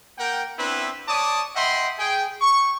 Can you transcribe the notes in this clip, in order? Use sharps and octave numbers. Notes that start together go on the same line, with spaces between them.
A#3 A#4 F#5 G5
B3 C4 D4 E4 B4
C#5 D5 A5 D6 D#6
D#5 E5 F#5 G5 B5 C6
G#4 G5
C#6